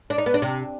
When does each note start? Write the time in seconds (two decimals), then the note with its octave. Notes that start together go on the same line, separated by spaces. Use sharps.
0.10 D4
0.18 D#4
0.26 B3
0.34 D4
0.42 C3